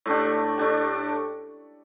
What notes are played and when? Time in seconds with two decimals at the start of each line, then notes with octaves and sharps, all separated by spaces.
0.06 A2 A3 D4 G4
0.58 A2 A3 D4 G4